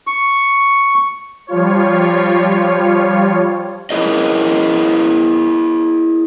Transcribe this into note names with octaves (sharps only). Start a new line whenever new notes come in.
C#6
F3 G3 F4 C#5
E4 G#4 A#4 C#5 D#5